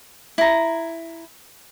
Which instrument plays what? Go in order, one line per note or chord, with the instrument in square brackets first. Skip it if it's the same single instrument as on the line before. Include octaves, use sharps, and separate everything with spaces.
[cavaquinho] E4 A#5